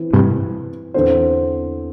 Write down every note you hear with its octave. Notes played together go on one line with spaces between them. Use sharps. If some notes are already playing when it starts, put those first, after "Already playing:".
Already playing: E3 C4 E4
G2 C3
E2 D3 C4 A4 C5